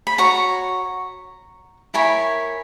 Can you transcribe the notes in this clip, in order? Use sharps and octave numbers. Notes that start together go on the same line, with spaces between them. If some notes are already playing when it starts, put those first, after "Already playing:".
B5
F#4 C#5 A#5 C#6
E4 A#4 C#5 G#5 B5